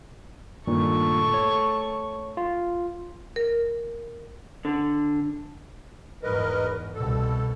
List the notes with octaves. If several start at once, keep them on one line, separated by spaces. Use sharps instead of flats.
G2 A#2 D#3 A3 C#6
C#5
F4
A#4
D3
E2 G#2 A#4 B4 D#5
C2 B2 A4